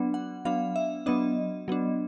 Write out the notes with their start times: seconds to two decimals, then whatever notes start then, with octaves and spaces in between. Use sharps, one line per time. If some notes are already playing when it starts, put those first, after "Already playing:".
Already playing: F#3 B3 D4
0.14 F#5
0.45 F#3 B3 D4 F5
0.76 E5
1.06 F#3 B3 D4 D#5
1.68 F#3 B3 D4